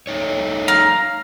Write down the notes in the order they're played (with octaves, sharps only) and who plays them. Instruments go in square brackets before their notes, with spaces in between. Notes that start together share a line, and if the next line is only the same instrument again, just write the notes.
[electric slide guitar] A3 D#4 C#5
[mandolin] F5 [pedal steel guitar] A#5